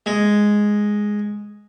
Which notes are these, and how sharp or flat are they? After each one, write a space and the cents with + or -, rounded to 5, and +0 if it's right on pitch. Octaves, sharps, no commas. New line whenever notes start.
G#3 +0